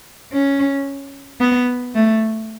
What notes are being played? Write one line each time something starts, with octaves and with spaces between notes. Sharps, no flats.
C#4
B3
A3